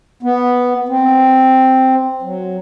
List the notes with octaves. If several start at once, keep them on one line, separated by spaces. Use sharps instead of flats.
B3
C4
F#3